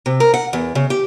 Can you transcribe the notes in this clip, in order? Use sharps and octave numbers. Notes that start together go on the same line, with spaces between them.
C3
A#4
F#5
E2
C#3
G4